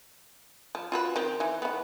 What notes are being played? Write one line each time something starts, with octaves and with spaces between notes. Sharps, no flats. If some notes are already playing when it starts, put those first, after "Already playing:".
F3
F4 F#4 B4
D#3 C4
E3
D#3 B3